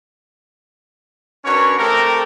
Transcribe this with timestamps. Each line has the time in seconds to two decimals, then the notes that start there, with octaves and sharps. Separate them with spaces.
1.45 C#4 D4 F#4 A#4 B4 C#5
1.77 A3 C4 G4 A4 A#4